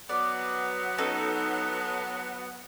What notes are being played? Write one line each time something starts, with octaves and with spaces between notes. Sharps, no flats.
F#3 B3 D5
C#4 D#4 A4